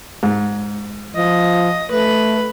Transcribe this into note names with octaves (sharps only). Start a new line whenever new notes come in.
G#2
F3 D#5
A3 B4